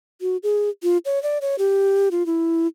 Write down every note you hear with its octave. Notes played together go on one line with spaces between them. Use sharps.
F#4
G#4
F4
C#5
D5
C#5
G4
F4
E4